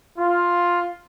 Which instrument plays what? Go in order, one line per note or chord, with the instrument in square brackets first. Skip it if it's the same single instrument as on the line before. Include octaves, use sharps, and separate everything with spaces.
[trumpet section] F4